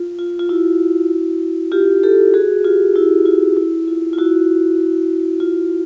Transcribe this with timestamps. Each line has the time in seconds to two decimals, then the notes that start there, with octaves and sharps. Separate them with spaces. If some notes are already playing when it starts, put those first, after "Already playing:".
Already playing: F4
0.19 F4
0.39 F4
0.49 E4 F#4
1.72 F4 G4
2.03 G4 A4
2.34 F#4 G#4
2.65 F4 G4
2.96 E4 F#4
3.25 F4
3.57 E4
3.88 F4
4.13 F4
4.18 E4 F#4
5.40 F4